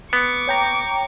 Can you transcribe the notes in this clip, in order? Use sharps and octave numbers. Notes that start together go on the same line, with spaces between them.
B3 C#6 D6
C#5 G5 A#5